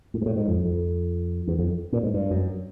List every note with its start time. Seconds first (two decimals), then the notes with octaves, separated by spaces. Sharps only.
0.14 A2
0.22 G#2
0.26 A2
0.36 G#2
0.48 F2
0.65 F2
1.47 E2
1.58 F2
1.92 A#2
2.03 G#2
2.14 G2
2.31 F#2